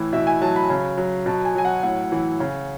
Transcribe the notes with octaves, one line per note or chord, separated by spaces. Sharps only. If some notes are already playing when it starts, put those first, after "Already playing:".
Already playing: A2 E3
B2 E5
G#5
F#3 A5
B5
C#3
F#3
B2 A5
G#5
F#3 G#5
F#5
A2 F#5
E3
C#3